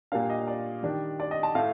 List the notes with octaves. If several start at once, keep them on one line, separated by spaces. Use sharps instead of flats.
A#2 G3 A#3 D4 F5
D#5
D5
D#3 G3 D4
D5
D#5
A5
A2 A3 F5